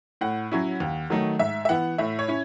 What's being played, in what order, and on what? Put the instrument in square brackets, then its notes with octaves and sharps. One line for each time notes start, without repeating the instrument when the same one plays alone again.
[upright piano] A2 F#5
F#3 C#4 E4
D#2
D#3 F#3 A3 D#4
G#2 E5
E5
E3 B3 F#5
A2 E5
C#5
C#4 E4